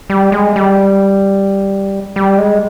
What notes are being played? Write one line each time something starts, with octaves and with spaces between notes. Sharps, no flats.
G3
G#3
G3
G3
G#3